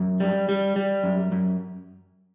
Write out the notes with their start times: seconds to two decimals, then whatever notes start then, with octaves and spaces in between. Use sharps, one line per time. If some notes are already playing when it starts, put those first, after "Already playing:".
Already playing: F#2
0.20 G3
0.49 G3
0.76 G3
1.04 F#2
1.32 F#2